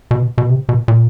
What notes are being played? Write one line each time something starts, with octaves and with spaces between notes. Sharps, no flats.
B2
B2
C3
B2
A#2